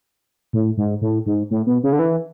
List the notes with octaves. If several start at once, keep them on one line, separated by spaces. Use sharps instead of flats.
A2
G#2
A2
G#2
A2
B2
C#3
D3
E3